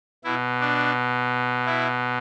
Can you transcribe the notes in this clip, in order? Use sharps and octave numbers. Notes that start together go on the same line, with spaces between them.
B2 E4
D4
E4